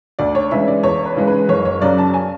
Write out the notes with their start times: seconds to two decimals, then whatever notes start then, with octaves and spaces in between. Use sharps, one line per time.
0.19 D2 D5
0.35 C#5
0.51 C#3 E3 G#3 E5
0.68 D5
0.83 E2 C#5
1.06 B4
1.16 C#3 E3 G#3
1.27 B4
1.49 F#1 C#5
1.65 C#5
1.82 F#2 C#3 F#3 D5
1.98 A5
2.14 G#5